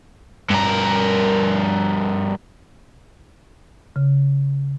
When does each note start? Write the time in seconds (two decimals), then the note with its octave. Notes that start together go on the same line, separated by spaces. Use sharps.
0.50 G2 A#4
3.96 C#3